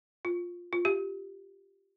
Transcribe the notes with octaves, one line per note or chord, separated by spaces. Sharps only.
F4
F4
G4